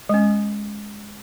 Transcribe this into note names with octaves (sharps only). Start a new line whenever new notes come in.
G#3 C#4